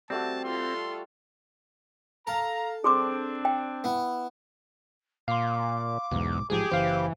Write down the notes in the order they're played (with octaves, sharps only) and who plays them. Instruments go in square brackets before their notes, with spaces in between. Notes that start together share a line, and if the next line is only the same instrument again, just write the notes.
[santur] G3 A3 F#4 [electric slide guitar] C4 [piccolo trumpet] A5
[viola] F4 A4 [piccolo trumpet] C6
[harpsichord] A4 [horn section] F5 A#5
[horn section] C4 D4 [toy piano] G#4 C6 D6
[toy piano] G5
[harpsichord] B3 E4
[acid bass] A#2 [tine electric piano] F5 C6 [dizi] D6
[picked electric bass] B1 G#2 [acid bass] E2
[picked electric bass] A1 G#2 F3 [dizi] G4 [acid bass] G#4
[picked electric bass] F#1 [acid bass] E3 [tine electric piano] C5 F5